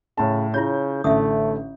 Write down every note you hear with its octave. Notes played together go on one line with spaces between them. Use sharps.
A2 C#3 A5
C#3 E4 F4 C#5 G6
A1 D3 A3 E5 D#6